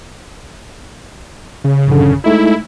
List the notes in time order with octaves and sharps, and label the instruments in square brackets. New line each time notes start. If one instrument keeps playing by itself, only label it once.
[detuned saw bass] C#3
[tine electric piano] A1 F#2 D3
[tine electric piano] G#3 A3 D#4 [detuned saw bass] E4